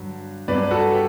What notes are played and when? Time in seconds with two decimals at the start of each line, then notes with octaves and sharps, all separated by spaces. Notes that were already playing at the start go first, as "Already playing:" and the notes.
Already playing: G2 D3 F#3
0.48 G2 F#3 B4 D5
0.64 B4
0.71 F#4 A4
0.93 G4